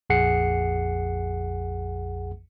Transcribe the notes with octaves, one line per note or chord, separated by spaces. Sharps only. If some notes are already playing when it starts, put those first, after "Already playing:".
A#1 F2 G#4 F#5 C7 C#7